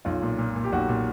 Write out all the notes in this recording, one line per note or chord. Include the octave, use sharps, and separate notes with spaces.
B1 F4
A#2
A#2
A#2
G4
B1 F#4
A#2